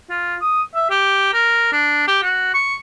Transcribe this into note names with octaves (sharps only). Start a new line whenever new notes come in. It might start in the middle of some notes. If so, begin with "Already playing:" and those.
F4
D#6
E5
G4
A#4
D4
G4
F#4
C#6